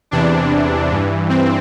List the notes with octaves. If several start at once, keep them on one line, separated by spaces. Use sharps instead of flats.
E2 C3 E3 D4
G2 E3
C4